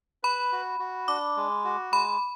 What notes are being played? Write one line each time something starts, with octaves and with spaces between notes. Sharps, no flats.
B4 B5
F#4
F#4
D4 D6
G#3
F#4
G#3 B5